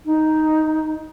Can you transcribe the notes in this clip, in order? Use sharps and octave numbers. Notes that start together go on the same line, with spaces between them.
D#4